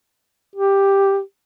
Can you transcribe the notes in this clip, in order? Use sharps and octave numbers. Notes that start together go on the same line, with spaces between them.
G4